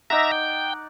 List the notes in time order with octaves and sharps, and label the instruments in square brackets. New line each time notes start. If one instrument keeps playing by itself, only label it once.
[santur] D#4 D5 F#5 [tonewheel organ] E5 A#5
[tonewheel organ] G5